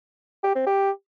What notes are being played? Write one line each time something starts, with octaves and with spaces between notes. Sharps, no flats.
G4
C4
G4